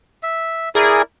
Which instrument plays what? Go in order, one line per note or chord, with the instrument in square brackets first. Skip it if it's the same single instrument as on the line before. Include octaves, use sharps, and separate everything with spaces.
[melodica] E5
[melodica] E4 A#4 D5 [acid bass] G#4